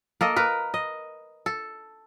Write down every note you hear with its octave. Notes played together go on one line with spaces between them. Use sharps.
A#3 A4 D#5
A#4 B4
D#5
A4